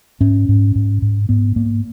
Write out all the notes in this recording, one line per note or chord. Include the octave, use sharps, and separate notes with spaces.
G#2 C#4
G#2
G#2
G#2
G#2 B3
G#2 A#3